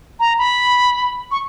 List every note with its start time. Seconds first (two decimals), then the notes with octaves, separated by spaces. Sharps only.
0.20 A#5
0.38 B5
1.31 C#6